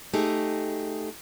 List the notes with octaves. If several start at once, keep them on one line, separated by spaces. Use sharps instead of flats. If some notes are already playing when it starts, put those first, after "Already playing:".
A3 D#4 G4 G#4